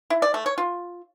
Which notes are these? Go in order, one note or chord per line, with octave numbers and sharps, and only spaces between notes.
E4
D5
A3
C#5
F4